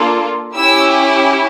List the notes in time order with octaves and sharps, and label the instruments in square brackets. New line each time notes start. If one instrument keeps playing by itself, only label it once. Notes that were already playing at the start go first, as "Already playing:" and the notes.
Already playing: [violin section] A#3 D4 F4 A4
C#4 E4 G4 E6